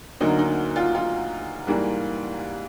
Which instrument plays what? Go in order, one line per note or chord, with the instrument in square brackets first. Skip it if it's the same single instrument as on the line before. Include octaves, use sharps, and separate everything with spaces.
[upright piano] D2 D3 F#3 A#3 D#4
D#4
F4
F4
G#2 E3 G3 A#3